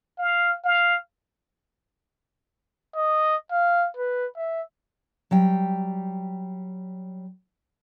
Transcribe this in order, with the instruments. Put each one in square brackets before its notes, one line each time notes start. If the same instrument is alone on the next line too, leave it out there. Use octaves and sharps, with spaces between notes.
[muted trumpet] F5
F5
[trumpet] D#5
F5
B4
E5
[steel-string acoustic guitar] F#3 G3 G5